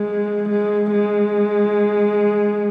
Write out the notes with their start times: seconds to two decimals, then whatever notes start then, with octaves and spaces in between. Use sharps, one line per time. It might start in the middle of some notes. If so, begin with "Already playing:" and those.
Already playing: G#3
0.49 G#3
0.91 G#3